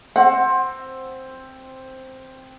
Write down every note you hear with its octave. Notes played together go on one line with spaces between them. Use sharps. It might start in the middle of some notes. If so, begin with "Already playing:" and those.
C4 F#5